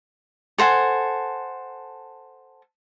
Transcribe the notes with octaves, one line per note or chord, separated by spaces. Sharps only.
A4 C5 F#5 G#5